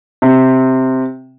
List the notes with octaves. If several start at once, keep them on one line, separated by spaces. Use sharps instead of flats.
C3